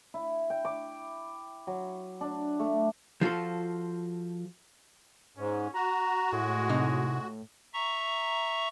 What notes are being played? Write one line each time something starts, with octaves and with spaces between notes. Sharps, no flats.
E4
G5
D6
F#3
D4
A3
F3 F4 F#4 A4
G#2 C#4
F#4 A#5
A2 G#3
C3 D#4 D#5
E5 A#5 C#6